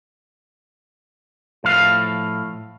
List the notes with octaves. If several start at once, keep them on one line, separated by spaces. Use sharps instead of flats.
A2 F3 F5